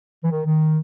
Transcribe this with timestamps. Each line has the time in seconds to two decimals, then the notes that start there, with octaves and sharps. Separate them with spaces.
0.24 E3
0.31 D#3
0.45 D#3